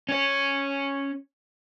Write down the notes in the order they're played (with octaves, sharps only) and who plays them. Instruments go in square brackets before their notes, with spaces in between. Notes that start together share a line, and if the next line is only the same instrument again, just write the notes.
[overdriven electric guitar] C#4 C#5